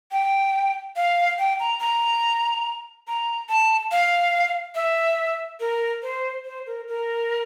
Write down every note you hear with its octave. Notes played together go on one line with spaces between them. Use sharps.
G5
F5
G5
A#5
A#5
A#5
A5
F5
E5
A#4
C5
C5
A#4
A#4